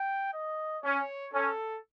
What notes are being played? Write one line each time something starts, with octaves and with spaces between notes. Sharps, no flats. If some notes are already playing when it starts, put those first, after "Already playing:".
Already playing: G5
D#5
C#4 C#5
C#4 A4